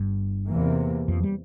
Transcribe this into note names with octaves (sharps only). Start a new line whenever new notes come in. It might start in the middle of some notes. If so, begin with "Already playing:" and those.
Already playing: G1 G2
E2 C3 E3 A#3
F2 F3
G3